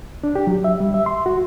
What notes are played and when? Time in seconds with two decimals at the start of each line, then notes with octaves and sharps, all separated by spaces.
0.24 D4
0.35 G4
0.47 F#3
0.64 E5
0.80 G3
0.94 E5
1.06 C6
1.26 F#4